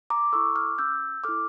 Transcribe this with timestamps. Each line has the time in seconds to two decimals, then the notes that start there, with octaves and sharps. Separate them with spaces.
0.10 A#5 D6
0.33 E4 A4 C#6 E6
0.56 D6 F6
0.78 C#4 E6 G6
1.24 E4 A4 D6 F6